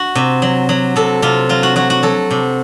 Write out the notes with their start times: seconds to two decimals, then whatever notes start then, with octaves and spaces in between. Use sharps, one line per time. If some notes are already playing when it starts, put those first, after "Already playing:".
Already playing: F#4
0.15 C3
0.42 F#3
0.69 F#3
0.96 C3 A4
1.22 C3 F4
1.49 F#3 F4
1.63 F#4
1.76 F#3 F#4
1.90 F#4
2.03 F#3 A4
2.31 C3